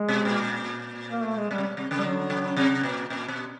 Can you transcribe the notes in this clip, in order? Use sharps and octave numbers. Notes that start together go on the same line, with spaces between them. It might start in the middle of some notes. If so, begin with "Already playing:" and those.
Already playing: G#3
B2
A#2
A#3
A3
G#3
B2 G3
C3
B2
C3
C#3
G3
D3 F#3
C#3
C3
A#2
A#2
B2